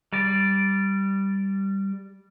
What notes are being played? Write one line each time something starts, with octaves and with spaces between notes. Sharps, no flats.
G3 D5